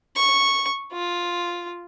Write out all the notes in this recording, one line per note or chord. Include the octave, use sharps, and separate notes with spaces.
C#6
F4